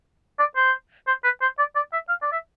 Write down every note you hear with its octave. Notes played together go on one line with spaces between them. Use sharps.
D5
C5
C5
B4
C5
D5
D5
E5
F5
D5
E5